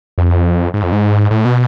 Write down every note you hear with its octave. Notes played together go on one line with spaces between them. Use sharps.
F2
G#2
F2
G#2
A2
B2